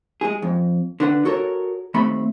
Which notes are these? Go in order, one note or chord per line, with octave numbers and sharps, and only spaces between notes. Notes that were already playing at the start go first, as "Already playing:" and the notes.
G#3 G#4
F2
D3 B4 F#5
F#4 A4 A#4 C#5
D#2 A3 C4 B5